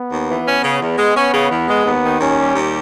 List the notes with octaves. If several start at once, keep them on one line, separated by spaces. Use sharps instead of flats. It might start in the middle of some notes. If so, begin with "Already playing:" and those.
Already playing: B3
D#2
E3
C#4
C#3
E2
G#3
B3 C#4
C#3
E2
G#3
D#2 B3
D#3
D#2 C#4
G3
D#2